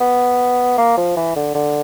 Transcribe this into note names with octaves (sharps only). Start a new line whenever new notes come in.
B3
A#3
F3
E3
D3
D3